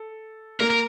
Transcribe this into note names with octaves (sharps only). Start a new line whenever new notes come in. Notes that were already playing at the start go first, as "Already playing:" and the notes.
Already playing: A4
A#3 A#4
A#4